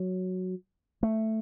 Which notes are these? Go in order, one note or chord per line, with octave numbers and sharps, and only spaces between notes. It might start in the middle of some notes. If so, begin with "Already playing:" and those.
Already playing: F#3
A3